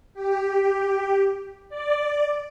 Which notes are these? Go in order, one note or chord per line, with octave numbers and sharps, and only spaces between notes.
G4
D5